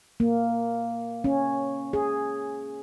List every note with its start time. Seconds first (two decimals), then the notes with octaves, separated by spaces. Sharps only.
0.20 A#3
1.24 C#4
1.93 G#4